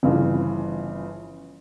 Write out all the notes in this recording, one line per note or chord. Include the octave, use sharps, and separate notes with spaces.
G1 C#3 E3 F3